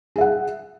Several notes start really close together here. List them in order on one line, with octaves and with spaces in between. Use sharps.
G#4 E5 F#5